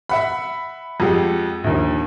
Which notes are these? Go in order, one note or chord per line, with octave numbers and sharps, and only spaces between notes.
E5 F#5 B5
F2 G#3 G4 F#5
A#1 D#2